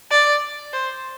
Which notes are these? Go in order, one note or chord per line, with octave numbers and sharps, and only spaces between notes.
D5
C5